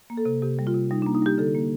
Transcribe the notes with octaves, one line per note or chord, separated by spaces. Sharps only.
A#3
A4
C3
C3 G4
G3
F4
C3
G3 D#4
A#3 D4
D#4
G3 G4
D3 A4
A#3